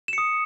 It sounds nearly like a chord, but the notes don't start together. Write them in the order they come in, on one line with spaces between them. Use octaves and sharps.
E7 C#7 D#6